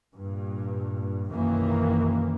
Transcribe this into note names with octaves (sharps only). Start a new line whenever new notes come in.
G2 A#2
B1 F#2 D#3 E3 A#3